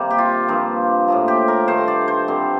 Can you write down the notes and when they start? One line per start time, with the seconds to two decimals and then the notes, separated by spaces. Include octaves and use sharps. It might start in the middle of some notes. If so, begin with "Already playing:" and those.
Already playing: C3 D#3 G3 A#3
0.11 G4
0.18 F4
0.48 G2 F3 A#3
1.08 A2 F3 A#3
1.28 G4
1.48 A#4
1.68 G2 D#3 A3 C5
1.88 D5
2.08 C5
2.28 G2 D3 G3 C4